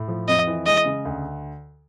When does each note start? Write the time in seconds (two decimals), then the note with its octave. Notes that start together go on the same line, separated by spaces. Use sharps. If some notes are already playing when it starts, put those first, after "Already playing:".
Already playing: A2
0.08 F3
0.28 F2 D#5
0.47 E3
0.66 G#3 D#5
0.85 C#3
1.05 D2